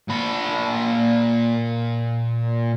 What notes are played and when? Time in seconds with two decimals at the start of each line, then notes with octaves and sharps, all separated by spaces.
0.08 A#2 B5